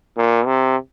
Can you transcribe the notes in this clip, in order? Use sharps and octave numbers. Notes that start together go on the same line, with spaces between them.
A#2
C3